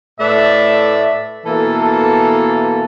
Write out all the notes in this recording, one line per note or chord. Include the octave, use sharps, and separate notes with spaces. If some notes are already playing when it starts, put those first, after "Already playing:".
A2 A3 B4 D5 E5
B2 E3 A#3 A4